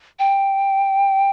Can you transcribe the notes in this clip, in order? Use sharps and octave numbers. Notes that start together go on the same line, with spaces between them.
G5